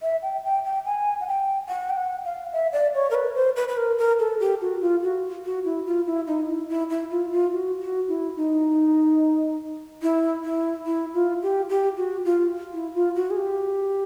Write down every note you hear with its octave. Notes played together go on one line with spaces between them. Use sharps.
E5
G5
G5
G5
G#5
F#5
G5
F#5
G5
F#5
F5
E5
D5
C#5
A#4
B4
C5
B4
B4
A#4
A#4
A4
G4
F#4
F4
F#4
F#4
E4
F4
E4
D#4
E4
E4
E4
F4
F4
F#4
F#4
E4
D#4
E4
E4
E4
F4
G4
G4
F#4
F4
E4
F4
F#4
G#4
G4